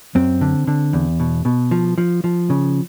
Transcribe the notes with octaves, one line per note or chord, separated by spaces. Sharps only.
F#2 C4
D3
D3
E2
B2
B2
F3
F3
F3
C#3